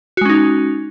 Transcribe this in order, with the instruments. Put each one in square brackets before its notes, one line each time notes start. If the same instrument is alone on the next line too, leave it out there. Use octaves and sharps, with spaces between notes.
[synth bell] F#4
G#3
C#4
D#4